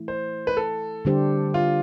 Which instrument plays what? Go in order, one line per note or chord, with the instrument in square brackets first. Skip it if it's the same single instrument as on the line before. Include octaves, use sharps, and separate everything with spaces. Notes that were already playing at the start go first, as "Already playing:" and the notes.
Already playing: [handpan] E3 A3 E4
[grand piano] C5
B4
A4
[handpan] D3 G3 D4 G4 C5
[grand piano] F4